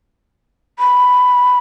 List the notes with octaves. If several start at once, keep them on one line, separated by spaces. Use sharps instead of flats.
B5